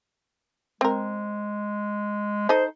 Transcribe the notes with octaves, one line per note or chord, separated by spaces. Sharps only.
G#3 C4 A#4
D#4 A4 C5 D#5